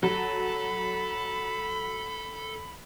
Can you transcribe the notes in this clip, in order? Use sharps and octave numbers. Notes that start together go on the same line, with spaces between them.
F#3 A4 B5